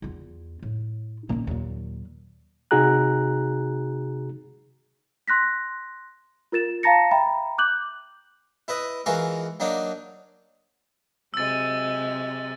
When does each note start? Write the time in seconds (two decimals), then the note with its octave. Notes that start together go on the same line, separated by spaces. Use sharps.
0.02 E2 F4
0.62 A2
1.29 D1 A#2 D#3 A#3 C#4
1.47 D#2 A#2 F#3
2.71 C3 D#4 F#4 G#4 A#5 F#6
5.28 C6 F#6 A#6 B6
6.52 F4 A#4 A6 E7
6.83 F5 A5 A#5 A6 A#6 C#7
7.11 E5 G5 A#5 B5
7.58 D6 F#6 G6 F#7
8.68 E4 B4 D#5
9.06 E3 G#3 F4 F#4 A#4
9.60 F#3 A#3 D4 D#4
11.34 C3 F#3 G#3 E6 A6